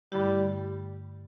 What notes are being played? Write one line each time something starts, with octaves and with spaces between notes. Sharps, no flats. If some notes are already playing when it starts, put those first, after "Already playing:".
G2 D3 G3 A3 E4 G4